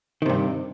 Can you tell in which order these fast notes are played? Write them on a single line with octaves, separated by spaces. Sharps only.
D#3 C3 G2